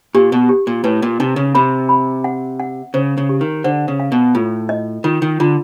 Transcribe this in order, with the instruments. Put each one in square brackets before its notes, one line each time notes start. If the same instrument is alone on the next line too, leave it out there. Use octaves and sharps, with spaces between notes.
[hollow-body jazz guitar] A#2 [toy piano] G4
[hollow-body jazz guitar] B2
[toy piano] G4
[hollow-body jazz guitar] A#2
[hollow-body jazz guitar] A2 [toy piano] B4
[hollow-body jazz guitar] A#2
[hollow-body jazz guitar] C3 [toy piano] D#4
[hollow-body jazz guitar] C#3
[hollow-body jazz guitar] C3 [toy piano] B5
[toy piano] B5
F#5
F#5
[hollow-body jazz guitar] C#3 [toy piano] C5
[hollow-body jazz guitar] C#3
[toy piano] G4
[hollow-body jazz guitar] D#3
[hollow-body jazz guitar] D3 [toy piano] C5
[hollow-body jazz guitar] C#3
[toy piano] F5
[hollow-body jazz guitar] B2
[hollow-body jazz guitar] A2 [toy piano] F4
[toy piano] D#5
[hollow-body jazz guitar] D#3 [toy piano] F4
[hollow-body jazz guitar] D#3
[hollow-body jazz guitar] D3 [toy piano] F4